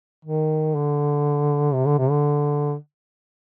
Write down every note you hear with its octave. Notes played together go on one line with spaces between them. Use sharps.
D#3
D3
C3
D3
C3
D3